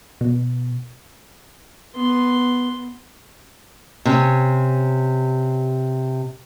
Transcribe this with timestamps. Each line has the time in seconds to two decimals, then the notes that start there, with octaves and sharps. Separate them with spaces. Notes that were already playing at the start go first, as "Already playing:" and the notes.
0.21 B2
1.95 B3 C6
4.05 C3 C#4